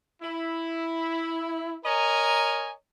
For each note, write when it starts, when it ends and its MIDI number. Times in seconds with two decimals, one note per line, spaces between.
0.23 1.77 64
1.85 2.71 70
1.85 2.71 73
1.85 2.71 75
1.85 2.71 80
1.85 2.71 82